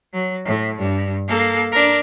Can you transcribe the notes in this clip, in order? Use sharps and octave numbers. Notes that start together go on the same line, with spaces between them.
F#3
A2
G2
A#3 A4
D4 A#4